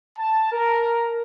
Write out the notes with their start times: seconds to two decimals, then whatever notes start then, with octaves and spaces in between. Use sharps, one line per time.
0.18 A5
0.52 A#4